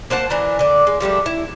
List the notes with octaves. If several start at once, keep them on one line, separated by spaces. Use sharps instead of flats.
A#3 C5 F#5 A5
E3 D4 A#4
D3 D5
G#3
F3 G3 A3 D4
E4